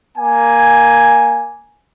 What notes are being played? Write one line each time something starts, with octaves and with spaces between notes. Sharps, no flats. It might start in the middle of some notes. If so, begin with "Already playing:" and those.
A#3 G#5